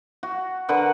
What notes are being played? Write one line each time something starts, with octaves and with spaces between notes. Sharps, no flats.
F#4
D3 A#4 B4 F#5